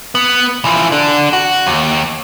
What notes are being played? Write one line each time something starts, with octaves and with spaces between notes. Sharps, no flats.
B3
E3 F3
D3 D4
F#4
D#2